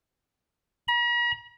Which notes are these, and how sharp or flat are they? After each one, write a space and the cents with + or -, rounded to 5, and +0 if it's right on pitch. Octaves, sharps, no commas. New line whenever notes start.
A#5 +45